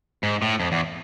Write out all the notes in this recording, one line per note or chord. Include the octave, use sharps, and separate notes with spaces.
G#2
A2
F2
E2